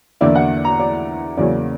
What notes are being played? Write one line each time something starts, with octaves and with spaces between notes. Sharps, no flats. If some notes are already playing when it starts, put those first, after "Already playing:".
E2 D3 A#3 E4 D5
F#5
A#5
D5
E2 C#3 F#3 A#3 C#4 D5